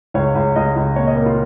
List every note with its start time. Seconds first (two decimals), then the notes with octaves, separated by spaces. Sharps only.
0.14 C#2 C#5
0.35 C#2
0.56 C#2 D#5
0.76 C#2
0.96 A#2 C#5
1.07 D#5
1.16 A#3
1.26 F4